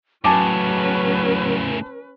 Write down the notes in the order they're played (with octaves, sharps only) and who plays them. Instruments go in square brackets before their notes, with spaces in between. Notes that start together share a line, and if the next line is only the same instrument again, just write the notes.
[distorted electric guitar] A2 C#3 [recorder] F#3 [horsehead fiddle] C#4 B4 [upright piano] G#5 A5 D6